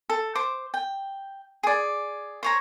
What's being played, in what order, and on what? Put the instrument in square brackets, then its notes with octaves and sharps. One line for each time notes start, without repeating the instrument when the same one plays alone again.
[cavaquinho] A4
C5 D6
G5
G#4 D5
C5 C#5 A#5